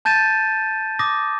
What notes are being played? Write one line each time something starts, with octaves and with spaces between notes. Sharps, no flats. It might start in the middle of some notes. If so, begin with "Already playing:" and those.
A5 G6 A6 D#7 E7
D6 D#6 A#6